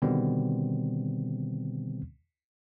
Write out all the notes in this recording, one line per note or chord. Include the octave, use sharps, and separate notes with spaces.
B2 D3 D#3 G3 B3 C4